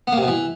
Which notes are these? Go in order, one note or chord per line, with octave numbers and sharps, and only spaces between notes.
B3
A#3
C3
B2
E3